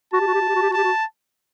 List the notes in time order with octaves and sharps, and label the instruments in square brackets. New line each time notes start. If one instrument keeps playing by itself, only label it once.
[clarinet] F#4 [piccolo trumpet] A5
[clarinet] G4
F#4
G4
F#4
G4
F#4
G4
F#4
[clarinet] G4 [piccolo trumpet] A5
[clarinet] F#4